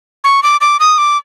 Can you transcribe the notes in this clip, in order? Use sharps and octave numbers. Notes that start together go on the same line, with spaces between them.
C#6
D6
D6
D#6
D6